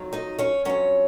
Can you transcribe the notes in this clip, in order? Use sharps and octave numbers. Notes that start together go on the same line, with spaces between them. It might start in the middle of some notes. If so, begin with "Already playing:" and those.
Already playing: F2 D#3 F#3
D#4 D#5
C#4 C#5
F2 D#3 F#3 C#4 C#5